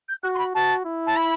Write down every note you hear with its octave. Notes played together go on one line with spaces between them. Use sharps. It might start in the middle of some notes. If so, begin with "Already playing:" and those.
G6
F#4 F#6
C6
B5
F#4 A5
E4
A5
B5